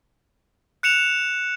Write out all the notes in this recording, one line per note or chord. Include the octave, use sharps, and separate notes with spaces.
F#6 C#7 E7 F7